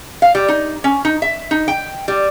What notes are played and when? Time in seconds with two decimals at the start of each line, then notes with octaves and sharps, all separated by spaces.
0.22 F5
0.35 G3
0.48 D#4
0.84 C#4
1.05 D#4
1.22 E5
1.51 D#4
1.68 G5
2.08 G3